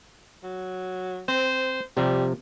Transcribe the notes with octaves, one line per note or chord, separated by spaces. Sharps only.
F#3
C4 C5
C3 F3 G3